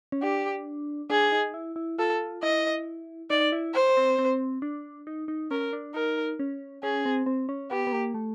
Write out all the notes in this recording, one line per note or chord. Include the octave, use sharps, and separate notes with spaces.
C#4
D4 G4
D4 G#4
D#4
E4
E4
F4 A4
E4 D#5
D#4 D5
E4
C5
C4
C4
D4
D#4
D#4
C#4 A#4
D4
D#4 A#4
C#4
C#4 G#4
C4
C4
C#4
B3 G4
B3
A#3
A3